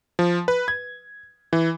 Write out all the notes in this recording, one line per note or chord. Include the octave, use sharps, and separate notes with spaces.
F3
B4
G#6
E3